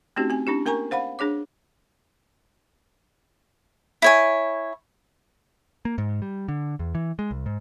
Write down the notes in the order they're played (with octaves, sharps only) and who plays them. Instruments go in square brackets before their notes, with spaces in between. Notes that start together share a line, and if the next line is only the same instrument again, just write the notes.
[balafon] A3 C4 C#4 D#4 F#4 G4
C4 G#5
C#4 D4 E4 G4
A#3 A#4 G#5 A#5 C#6
C5 F5 F#5 B5
D4 G#4 C#5 D6
[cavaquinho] E4 C#5 G#5
[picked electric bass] A#3
G#2
G3
D3
E2
E3
G#3
C2
G#2